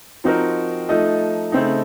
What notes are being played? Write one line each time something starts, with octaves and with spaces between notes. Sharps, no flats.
F3 C4 D#4 F#4 A#4
F3 A3 D#4 A4 D#5
C#3 A3 C4 D#4